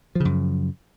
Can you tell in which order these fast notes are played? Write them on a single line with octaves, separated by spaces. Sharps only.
F3 C#3 F#2